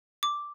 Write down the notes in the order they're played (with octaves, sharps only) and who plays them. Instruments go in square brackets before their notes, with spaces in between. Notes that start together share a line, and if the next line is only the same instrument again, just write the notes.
[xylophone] D6